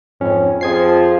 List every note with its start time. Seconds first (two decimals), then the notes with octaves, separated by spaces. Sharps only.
0.21 F2 G#2 C#4
0.61 F2 F3 G#4 G#6 C7